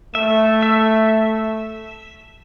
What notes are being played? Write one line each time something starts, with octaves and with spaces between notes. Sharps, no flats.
A3 E5
E5